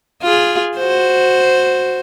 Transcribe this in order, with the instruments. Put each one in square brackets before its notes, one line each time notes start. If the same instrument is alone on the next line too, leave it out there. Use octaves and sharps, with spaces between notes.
[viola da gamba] F4 G#4
F#4 C5